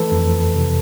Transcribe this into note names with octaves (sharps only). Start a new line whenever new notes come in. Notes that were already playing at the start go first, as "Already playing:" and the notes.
Already playing: E3 A3 A4 B4
F2
C3